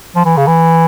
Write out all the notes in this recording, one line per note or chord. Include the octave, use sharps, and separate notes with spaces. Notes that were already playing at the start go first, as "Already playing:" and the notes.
F3
E3
C#3
E3